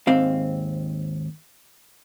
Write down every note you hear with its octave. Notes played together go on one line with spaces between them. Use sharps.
D#2 G#2 C4 F5